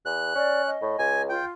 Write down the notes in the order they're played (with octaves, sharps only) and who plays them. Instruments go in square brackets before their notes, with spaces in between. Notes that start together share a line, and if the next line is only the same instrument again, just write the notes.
[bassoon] E2 [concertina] F#6
[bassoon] C#4 [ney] D5
[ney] D#5
[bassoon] A2
[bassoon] C#2 [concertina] G#5
[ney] F4 [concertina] G5